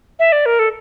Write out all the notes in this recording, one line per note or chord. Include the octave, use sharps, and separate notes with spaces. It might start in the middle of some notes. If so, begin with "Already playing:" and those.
E5
D5
A#4
A4